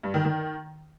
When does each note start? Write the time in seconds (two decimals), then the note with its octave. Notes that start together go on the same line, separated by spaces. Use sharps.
0.03 G2
0.14 D#3
0.25 D#3